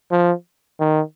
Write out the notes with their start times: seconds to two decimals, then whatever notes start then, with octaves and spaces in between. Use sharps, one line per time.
0.11 F3
0.80 D#3